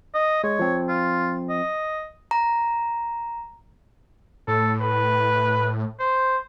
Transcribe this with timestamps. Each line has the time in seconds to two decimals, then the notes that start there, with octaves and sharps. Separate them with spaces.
0.14 D#5
0.44 G#3 C#5
0.59 F3 C4
0.89 F4
1.50 D#5
2.31 A#5
4.48 A2 A4
4.82 B4
6.00 C5